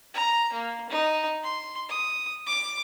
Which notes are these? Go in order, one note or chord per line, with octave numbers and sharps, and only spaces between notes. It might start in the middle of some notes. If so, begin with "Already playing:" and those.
A#5
A#3
D#4
C6
D#6
D6